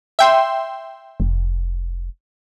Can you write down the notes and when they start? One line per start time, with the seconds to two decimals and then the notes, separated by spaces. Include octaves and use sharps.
0.19 E5 G5 C6
1.20 F1